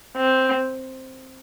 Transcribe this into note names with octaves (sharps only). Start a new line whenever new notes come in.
C4